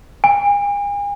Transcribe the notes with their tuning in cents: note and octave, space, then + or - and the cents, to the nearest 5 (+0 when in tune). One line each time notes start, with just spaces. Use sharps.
G#5 -40